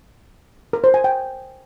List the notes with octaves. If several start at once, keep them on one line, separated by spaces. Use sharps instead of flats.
A#4
C5
G#5
G5